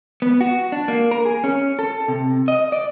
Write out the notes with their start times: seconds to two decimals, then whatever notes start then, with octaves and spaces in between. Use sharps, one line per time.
0.22 B3
0.41 F#4
0.72 D4
0.88 A#3
1.11 A#4
1.25 G#4
1.44 C#4
1.79 A4
2.08 C3
2.48 D#5
2.72 D5